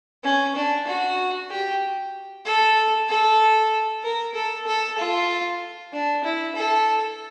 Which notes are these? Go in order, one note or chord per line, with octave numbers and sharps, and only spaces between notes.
C#4
D4
F#4
G4
A4
A4
A#4
A4
A4
F4
D4
E4
A4